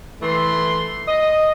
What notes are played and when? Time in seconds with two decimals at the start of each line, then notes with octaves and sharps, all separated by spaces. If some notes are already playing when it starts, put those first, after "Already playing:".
0.21 E3 A3 C6
1.07 D#5